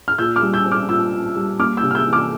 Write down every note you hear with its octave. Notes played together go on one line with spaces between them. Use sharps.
F6
A#2 E6 G6
D6 F6
G3
E6 G6
C4
D6 F6
A#2 E6 G6
A#2
G3
A#3 D6 F6
E6 G6
C3
F6
E6 G6
E3
D6 F6